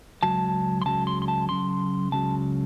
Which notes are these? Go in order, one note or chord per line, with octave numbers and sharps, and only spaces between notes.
C#2 C#3 F#3 A5
C6
C#2 C#3 F#3 A5
C6
C6
A5
C#2 C#3 F#3 C6
C#2 C#3 F#3 A5